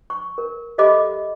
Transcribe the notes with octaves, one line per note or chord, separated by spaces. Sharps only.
C#6
A#4
G4 A4 D#5 E5 B5 D6